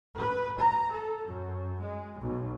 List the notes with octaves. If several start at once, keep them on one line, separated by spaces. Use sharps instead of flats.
B4
A#5
A4
F#2
G#3
B1